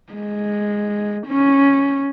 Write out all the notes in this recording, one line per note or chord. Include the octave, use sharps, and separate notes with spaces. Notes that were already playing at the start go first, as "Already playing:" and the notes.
G#3
C#4